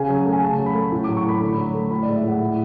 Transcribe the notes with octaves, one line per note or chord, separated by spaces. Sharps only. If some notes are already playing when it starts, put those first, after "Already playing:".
Already playing: C#3 G#5
F#3
A3
G#5
C#3 A5
F#3
B5
A3
A2
D6
F#3
C#6
A3 B5
D3 B5
F#3
A3
A2 B5
D5
G#3
E5
A2 F#5
A2